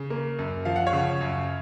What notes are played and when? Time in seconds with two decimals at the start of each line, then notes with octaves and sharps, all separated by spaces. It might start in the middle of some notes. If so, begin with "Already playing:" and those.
Already playing: C#3
0.10 A#3
0.39 F#2
0.65 F3 F5
0.76 F#5
0.87 C#5 F5
0.93 C#3
1.21 F#2